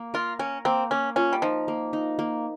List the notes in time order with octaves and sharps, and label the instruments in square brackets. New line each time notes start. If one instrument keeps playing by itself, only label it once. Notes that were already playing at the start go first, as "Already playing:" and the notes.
Already playing: [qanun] A#3
[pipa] F4 [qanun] A#4
[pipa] C#4 [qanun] A#4
[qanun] A#3 [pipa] C4
[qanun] A#3 [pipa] C#4
[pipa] C#4 [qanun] F4
[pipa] G3
[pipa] F3 [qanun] D#4
[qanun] A#3
D#4
A#3